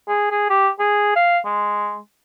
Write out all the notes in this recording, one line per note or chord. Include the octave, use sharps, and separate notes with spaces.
G#4
G#4
G4
G#4
F5
G#3